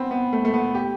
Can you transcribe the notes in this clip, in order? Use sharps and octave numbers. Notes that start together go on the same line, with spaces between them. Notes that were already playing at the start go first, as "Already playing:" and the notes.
Already playing: B3 C4
B3
A3
A3
B3
G4